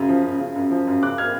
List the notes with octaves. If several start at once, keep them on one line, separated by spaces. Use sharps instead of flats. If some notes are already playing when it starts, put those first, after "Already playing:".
Already playing: F#2 C#3
F3
F#2
C#3
F#2
F3
F#2
C#3 D6 F#6
F6 G#6